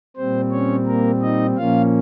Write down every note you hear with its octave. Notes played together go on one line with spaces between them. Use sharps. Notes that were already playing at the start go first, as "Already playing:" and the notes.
A#2 G3 C4 C5
C#4 C#5
A#3 A#4
D#4 D#5
A#2 F3 A#3 C#4 F4 F5